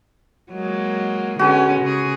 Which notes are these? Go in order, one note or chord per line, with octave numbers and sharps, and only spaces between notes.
F#3 G#3 A#3
D3 G#3 B3 C#4 F#4
C#3 G#4